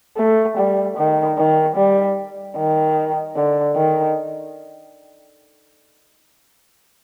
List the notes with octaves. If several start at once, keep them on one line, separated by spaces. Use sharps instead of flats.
A3
G3
D#3
D#3
G3
D#3
D3
D#3